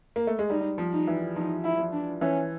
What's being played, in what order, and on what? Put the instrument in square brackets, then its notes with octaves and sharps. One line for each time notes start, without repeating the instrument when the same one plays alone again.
[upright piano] A#3
A3
G#3
[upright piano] G3 [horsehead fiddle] D#4
[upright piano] F3
[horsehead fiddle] D#4
[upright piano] E3
[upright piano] F3 [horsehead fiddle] D#4
[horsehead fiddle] E4
[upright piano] F3
[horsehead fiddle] D4
[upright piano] E3 [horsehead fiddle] C#4